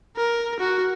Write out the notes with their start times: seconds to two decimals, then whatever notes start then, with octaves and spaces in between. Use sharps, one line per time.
0.17 A#4
0.60 F#4